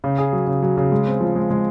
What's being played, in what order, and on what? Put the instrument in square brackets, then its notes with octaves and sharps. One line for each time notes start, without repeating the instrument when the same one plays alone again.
[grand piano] C#3
G#4
F#3
C#3
F#3
C#3
G#3
C4
F3
G#3
G#3